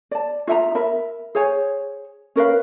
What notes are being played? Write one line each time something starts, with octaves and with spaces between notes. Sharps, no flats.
D5 A5
F4 E5 G5 A#5
A#4 E5 B5
G#4 C5 C#5 G#5
C#4 A#4 B4 F5